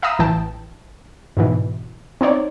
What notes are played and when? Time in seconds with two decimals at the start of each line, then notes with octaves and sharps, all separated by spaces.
0.02 E5 F5 A#5 B5 D#6 E6
0.19 A1 E3 G5 A5
1.37 G#2 B2 E3
2.21 C4 D#4 C#5 D5